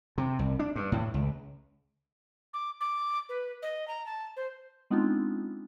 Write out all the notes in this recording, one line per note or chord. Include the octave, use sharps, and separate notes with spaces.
C3
C2
D4
G2
A2
C#2
D6
D6
B4
D#5
A#5
A5
C5
G#3 B3 C4 D4 D#4 F4